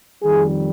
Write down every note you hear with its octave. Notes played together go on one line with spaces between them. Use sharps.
F2 D#3 G3 G#4